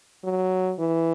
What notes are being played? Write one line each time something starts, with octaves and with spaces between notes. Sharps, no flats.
F#3
E3